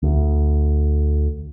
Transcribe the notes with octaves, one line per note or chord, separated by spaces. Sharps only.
D2